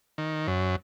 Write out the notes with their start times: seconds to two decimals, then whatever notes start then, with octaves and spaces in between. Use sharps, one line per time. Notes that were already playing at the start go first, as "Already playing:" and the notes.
0.18 D#3
0.47 F#2